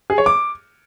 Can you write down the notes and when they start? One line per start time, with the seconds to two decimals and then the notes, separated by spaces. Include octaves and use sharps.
0.10 G#4
0.18 C#5
0.26 D6